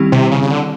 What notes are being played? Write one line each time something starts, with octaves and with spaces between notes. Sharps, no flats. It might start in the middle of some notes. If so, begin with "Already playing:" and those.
Already playing: D#3 G3 C4 E4 G4
C3
C#3
C#3
D3